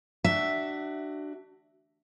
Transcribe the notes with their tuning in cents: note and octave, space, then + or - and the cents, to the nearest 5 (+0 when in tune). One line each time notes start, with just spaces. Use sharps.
D4 +20 F#4 +30 E5 +0